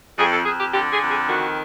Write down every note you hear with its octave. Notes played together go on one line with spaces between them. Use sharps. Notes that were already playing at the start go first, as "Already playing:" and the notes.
F2 G#4
A4
F2 G#4
G4
D3 G4
G#4
F2
G#4
D#3 F#4